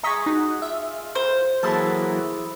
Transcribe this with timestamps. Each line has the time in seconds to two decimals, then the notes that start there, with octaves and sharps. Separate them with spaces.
0.03 G#4 D#5 A#5 C#6 B6
0.26 D#4 F#4
0.62 F4 E5
1.15 C5
1.63 E3 F#3 A#3 E4 G#4 A4 A5